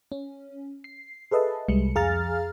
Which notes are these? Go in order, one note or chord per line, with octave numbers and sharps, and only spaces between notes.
C#4
C7
G#4 A4 B4 D#5 E5 A5
C2 G3 G#3 C#7
F2 G#4 F5 A#5 F6 A6